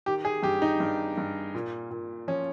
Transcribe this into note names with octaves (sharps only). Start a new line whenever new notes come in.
D#3 G4
G#4
G2 G4
D#4
G2
G2
A#2
A#2
F3 C#4